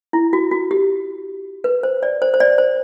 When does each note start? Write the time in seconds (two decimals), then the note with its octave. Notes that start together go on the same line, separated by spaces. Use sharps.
0.13 E4
0.33 F#4
0.51 F#4
0.71 G4
1.64 B4
1.83 C5
2.03 D5
2.22 C5
2.34 C5
2.40 D5
2.58 C5